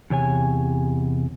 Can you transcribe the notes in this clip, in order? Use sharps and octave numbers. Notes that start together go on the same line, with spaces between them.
E2 C3 C#5 G#5